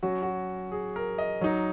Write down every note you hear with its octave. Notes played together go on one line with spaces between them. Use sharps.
F#3 C#4 F#4
F#4
G#4
A#4
D#5
F#3 D#4